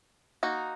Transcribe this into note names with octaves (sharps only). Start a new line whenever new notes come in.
A#3 D#4 F#4